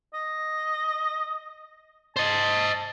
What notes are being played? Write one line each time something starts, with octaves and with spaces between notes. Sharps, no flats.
D#5
C5 D#5 A5